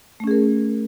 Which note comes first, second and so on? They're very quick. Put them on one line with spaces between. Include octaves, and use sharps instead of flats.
A3 C#4 G#4 A#4